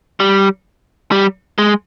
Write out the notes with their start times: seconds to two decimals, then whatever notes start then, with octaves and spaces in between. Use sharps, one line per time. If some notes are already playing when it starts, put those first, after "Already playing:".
0.20 G3
1.12 G3
1.58 G#3